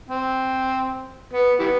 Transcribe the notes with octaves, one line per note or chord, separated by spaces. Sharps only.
C4
B3
E3 G3 B3